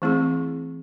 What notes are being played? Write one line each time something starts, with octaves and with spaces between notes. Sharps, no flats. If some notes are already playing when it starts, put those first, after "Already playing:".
E3 A3 C4 E4 G#4